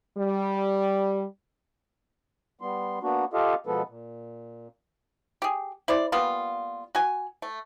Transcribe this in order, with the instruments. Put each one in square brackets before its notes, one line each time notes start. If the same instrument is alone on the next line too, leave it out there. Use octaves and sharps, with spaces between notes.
[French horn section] G3
[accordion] G3 B3 C6
A#3 B3 D4 F#4
F4 G4 A4 D#5 F5
B2 F3 G#3 B3 A4 B4
A#2
[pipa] G4 G#4
E4 C5 D5
G3 A#3 B3 F4
F#4 G#5
A3